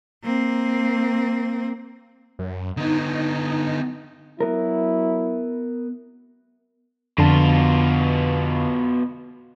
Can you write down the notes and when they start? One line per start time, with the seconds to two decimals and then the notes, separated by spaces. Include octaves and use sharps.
0.23 A#3 C4
2.39 F#2
2.77 D3 B3 D#4
4.40 F#3 B3 E4 A#4
7.18 F2 B2 D3 F4 A5